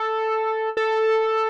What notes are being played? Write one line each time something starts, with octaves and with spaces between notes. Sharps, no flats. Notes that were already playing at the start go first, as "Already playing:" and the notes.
Already playing: A4
A4